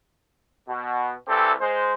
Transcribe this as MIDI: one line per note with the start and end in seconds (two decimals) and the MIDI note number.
0.68 1.13 47
1.28 1.52 36
1.28 1.52 52
1.28 1.52 60
1.28 1.52 67
1.28 1.52 69
1.60 1.94 56
1.60 1.94 72